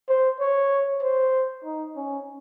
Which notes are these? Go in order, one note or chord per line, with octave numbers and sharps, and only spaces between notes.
C5
C#5
C5
D#4
C#4